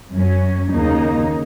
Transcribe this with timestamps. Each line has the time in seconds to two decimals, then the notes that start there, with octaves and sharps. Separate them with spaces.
0.13 F#2 F#3 C#4
0.71 D#2 C#3 A#3 D#4